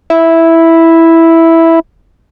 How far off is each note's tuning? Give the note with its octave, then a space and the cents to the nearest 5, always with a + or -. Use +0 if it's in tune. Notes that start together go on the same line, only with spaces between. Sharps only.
E4 -5